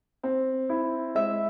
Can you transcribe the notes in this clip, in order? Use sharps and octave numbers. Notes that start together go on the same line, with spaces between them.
C4
E4
G#3 E5